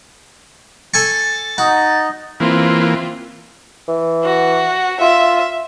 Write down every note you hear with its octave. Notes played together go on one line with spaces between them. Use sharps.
A4 G#5 C#6 A6
D#4 F#4
E3 A#3 C4 F4
E3
F#4
F4 E5